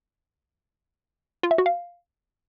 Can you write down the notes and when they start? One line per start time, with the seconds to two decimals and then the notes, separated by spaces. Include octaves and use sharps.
1.43 F4
1.51 E5
1.58 F#4
1.66 F5